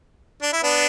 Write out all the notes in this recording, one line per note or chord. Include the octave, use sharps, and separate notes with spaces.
D4
E4
B3 D4